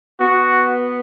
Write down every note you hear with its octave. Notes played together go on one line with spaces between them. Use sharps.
B3 F#4